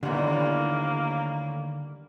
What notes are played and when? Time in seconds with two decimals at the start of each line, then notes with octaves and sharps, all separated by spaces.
0.03 D#2 A2 D3 G3 A#3 B3